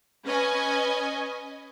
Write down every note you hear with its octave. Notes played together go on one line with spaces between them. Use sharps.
C#4 B4 D#5 G#5